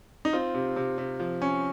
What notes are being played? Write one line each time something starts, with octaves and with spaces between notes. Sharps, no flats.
D#4
C4 F4
C3
C3
C3
F3
C#4